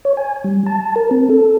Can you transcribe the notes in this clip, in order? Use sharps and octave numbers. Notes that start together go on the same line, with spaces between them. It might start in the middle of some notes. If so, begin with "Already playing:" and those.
C#5
G#5
G3
A5
A#4
C4
A4